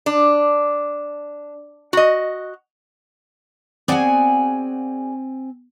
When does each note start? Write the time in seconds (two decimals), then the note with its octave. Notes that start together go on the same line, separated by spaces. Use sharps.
0.06 D4
1.93 F#4 D#5
3.88 C4 F#4 G#4 D5 G#5